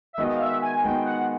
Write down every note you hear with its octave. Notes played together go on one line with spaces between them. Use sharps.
E5
D#3 G#3 B3 D#4 F#4 D#5
F5
E5
G#5
D#3 G#3 B3 D#4 F#4 G5
F#5